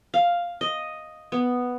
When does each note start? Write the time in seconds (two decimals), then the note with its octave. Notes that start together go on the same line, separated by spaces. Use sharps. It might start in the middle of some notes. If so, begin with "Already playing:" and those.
0.14 F5
0.61 D#5
1.32 B3